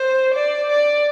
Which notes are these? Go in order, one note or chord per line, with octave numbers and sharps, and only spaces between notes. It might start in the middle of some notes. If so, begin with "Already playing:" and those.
Already playing: C5
D5
D5